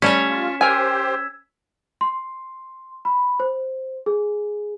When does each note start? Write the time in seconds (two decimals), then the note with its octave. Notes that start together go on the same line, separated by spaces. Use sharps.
0.02 G3 A3 C#4 C#5 B6 E7
0.30 F4
0.61 G4 A#4 C5 G#5 E6 G#6
2.01 C6
3.05 B5
3.40 C5
4.06 G#4